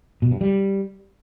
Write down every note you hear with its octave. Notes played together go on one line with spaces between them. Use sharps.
B2
G2
G3